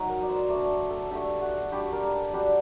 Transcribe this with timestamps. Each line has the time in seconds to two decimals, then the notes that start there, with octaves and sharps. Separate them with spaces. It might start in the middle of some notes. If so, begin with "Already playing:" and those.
Already playing: F#3 D#4
0.09 A#4
0.23 D5
0.29 C5
0.50 A3 D4 D5
0.90 A4
1.11 A3 D4 G4
1.41 F#4
1.72 G3 D4 G4
1.92 A#4
2.03 A4
2.33 G3 D4 F#4